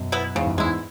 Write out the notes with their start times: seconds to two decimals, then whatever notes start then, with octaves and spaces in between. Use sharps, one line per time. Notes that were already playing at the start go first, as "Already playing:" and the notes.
Already playing: F#2 B2
0.12 B3 E4
0.35 E2 G#2 C#3
0.47 F#2
0.57 E2 G#2 G#3 E4